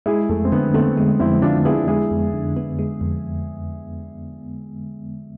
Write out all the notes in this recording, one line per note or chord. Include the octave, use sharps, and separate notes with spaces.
G#3 E4 G#4
F2 A3
C4
D3 B3
A3 B3 C4
G#3
F2 C4 E4
D3 D4 F4
B3 E4 G#4
G#3 E4 G#4
F2
D3
B3
G#3
F2